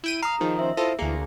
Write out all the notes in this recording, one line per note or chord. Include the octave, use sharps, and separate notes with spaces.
E4 G5 D#7
F5 A#5 D#6
D#3 F3 D#4 G#4
C#4 C5 E5
E4 F4 A4 C5 D#5
D2 E3 A#3 G#4